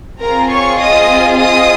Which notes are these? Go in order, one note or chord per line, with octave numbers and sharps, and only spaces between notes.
C4 F4 G#4 A#4 A#5
C#5 C#6
D#5 D#6
D#5 D#6